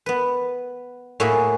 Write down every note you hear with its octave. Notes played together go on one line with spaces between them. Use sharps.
B3 B4
A2 A#3 F#4 G#4 E5 B5